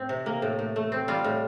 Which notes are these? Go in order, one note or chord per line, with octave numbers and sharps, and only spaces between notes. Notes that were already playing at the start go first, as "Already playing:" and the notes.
Already playing: A2 C4
C3
A#3
A2
A2
A3
C4
G3 F4
A2